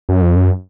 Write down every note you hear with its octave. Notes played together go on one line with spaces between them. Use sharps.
F#2
F2
F#2